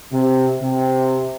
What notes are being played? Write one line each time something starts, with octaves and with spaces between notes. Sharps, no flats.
C3
C3